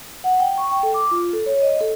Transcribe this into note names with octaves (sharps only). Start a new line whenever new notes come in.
F#5
G5
C#6
G5
A4
D6
F4
A4
C#5
D#5
A4